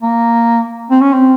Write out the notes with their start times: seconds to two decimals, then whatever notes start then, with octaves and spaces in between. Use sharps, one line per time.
0.02 A#3
0.90 C4
1.01 C#4
1.13 C4